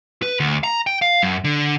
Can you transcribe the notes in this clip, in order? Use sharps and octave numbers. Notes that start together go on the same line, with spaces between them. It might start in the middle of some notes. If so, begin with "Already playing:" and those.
B4
D2
A#5
G5
F5
F#2
D3